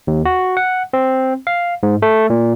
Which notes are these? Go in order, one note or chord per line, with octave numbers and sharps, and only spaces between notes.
D#2
F#4
F#5
C4
F5
G#2
A3
A#2